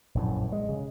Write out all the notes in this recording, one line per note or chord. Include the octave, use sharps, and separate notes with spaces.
A#1 F#2 A2
G#3
C#3